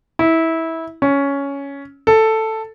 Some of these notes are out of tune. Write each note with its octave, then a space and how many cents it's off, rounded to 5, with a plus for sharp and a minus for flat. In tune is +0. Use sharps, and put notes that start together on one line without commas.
E4 -20
C#4 +10
A4 +5